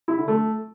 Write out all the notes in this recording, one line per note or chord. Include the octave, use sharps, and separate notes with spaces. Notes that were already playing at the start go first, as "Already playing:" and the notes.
E4
D3
A3